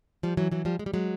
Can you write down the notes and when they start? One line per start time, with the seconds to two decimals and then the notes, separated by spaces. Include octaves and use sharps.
0.23 F3 G3
0.37 E3 F#3
0.51 E3 F#3
0.65 F3 G3
0.79 G#3
0.86 G3
0.94 F#3 G#3